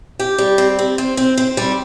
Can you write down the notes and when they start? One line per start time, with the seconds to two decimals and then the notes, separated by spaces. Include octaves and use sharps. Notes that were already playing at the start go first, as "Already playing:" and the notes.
0.19 G4
0.38 G3
0.58 C4
0.79 C4
0.98 C4
1.17 C4
1.37 C4
1.57 G3